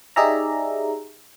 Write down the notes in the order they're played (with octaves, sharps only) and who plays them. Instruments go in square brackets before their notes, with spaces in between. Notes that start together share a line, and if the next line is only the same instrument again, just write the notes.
[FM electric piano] D#4 G4 G#4 D5 E5 A#5